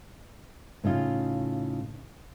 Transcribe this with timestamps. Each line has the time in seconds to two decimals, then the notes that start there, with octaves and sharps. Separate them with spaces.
0.84 A2 C#3 D#4 F4